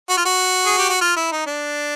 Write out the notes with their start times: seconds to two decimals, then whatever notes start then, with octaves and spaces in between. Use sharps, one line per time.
0.09 F#4
0.17 F4
0.26 F#4
0.66 G#4
0.78 G4
0.90 F#4
1.01 F4
1.16 E4
1.32 D#4
1.47 D4